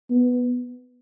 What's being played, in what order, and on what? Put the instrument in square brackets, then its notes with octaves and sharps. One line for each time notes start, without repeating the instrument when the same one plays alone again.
[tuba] B3